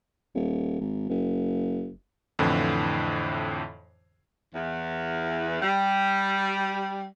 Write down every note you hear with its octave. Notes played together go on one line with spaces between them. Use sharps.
D#1
G#1
F#1
F2 A2 D3 E3
E2
G3